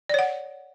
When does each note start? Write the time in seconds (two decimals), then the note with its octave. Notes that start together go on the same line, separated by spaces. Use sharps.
0.10 D5
0.14 C#5
0.19 F#5